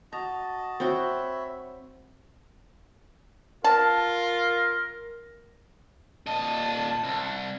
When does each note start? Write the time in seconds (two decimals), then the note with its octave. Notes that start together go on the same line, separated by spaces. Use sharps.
0.12 F#4 D#5 A5 A#5
0.80 C4 F#4 C#5 E5 B5
3.64 F4 A#4 A5
6.27 A#2 D#5 A5
7.04 C2